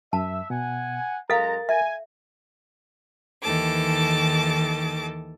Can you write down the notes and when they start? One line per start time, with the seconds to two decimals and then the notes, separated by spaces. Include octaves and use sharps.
0.13 F#2 E5 A5
0.50 B2 F#5 G#5
1.30 F#2 G#3 A4 A#4 F5 A#5 A6
1.69 E5 G#5
3.42 D#2 D#3 E3 A4 A5 D6